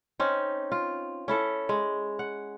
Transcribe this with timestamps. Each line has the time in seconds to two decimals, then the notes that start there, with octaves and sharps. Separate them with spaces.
0.20 C4 C#4 D#4
0.72 F4
1.28 C#4 E4 A4
1.69 G#3
2.19 F#5